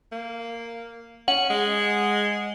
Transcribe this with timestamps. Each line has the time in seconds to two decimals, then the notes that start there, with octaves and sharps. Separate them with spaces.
0.12 A#3
1.28 C#4 F#5
1.50 G#3